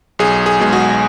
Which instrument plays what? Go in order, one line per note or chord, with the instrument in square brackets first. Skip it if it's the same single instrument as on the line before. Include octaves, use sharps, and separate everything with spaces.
[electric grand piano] B1 G#4
G#4
B2 G#3
F#4